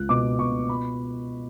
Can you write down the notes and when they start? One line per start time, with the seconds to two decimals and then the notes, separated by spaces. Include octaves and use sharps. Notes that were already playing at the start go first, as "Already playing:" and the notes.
Already playing: C#2 F#6
0.09 B2 D6
0.39 B2 C#6
0.69 B5